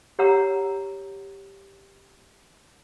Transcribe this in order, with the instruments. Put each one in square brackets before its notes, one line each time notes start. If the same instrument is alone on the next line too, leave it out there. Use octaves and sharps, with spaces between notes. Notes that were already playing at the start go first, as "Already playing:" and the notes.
[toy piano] G4 C#5 F#5 A#5 E6